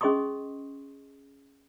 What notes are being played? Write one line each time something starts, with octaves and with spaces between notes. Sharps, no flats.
C#4 G#4 D#5 C6 C#6 D#6